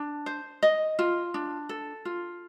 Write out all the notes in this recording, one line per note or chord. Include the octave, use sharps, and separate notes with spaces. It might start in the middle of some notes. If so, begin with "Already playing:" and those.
Already playing: D4
C5
D#5
F4
D4
A4
F4